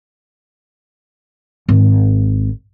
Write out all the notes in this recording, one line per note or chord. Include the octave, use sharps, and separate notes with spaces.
G#1